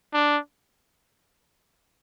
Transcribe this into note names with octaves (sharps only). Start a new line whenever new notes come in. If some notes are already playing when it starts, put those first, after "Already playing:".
D4